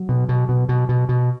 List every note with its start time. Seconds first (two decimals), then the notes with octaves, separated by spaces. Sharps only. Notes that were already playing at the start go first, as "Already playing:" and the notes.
Already playing: F#3
0.09 B2
0.29 B2
0.49 B2
0.69 B2
0.89 B2
1.09 B2